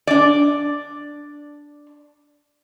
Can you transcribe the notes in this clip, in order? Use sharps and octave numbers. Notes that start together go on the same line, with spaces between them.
D4 D5